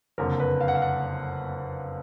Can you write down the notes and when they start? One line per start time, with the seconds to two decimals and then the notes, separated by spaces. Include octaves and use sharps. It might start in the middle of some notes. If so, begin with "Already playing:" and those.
0.18 F#1 F2 D3 A#4
0.40 B4
0.61 F5
0.68 F#5
0.75 F5
0.82 F#5